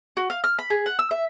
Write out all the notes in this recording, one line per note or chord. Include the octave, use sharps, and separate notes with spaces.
F#4
F5
F6
B5
G#4
F#5
E6
E5